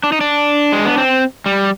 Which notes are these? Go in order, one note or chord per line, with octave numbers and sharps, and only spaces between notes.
D4
D#4
D4
G#3
B3
C4
G3